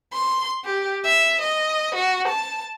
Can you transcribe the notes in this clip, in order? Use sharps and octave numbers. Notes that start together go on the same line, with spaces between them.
C6
G4
E5
D#5
F#4
A5